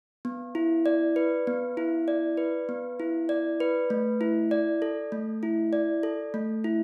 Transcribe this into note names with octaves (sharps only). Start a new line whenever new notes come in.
B3
E4
D5
B4
B3
E4
D5
B4
B3
E4
D5
B4
A3
E4
D5
A4
A3
E4
D5
A4
A3
E4